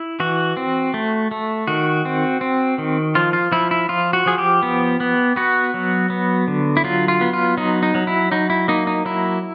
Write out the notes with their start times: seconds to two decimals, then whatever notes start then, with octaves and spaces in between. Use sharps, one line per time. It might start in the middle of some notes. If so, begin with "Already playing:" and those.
Already playing: E4
0.20 E3 F#4
0.57 C4
0.94 A3
1.31 A3
1.67 D#3 F#4
2.05 C4
2.41 C4
2.78 D#3
3.15 F3 F4
3.33 F4
3.52 F3 E4
3.71 E4
3.89 F3 F4
4.13 F#4
4.26 F3 G#4
4.38 G4
4.63 B3
5.00 B3
5.36 B3 F#4
5.74 F#3
6.10 B3
6.48 D3
6.77 E4
6.84 F#3 F4
7.08 F4
7.21 B3
7.33 F4
7.57 F#3 D#4
7.83 D#4
7.95 F#3
8.07 E4
8.32 F#3 D#4
8.50 E4
8.68 A#3 D#4
8.87 D#4
9.05 F#3 E4